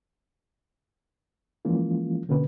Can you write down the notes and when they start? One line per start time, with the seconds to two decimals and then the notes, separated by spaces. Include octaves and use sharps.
1.65 E3 F3 G#3 A#3 C#4 F4
2.29 B2 D3 A#3 C#4 F#4 B4